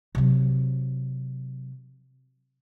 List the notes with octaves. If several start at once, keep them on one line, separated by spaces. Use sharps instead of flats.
C3 F#3